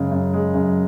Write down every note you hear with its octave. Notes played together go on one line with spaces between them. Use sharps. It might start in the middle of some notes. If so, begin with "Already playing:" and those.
Already playing: F#2 C#3 G#3
F#2
G#3
F#2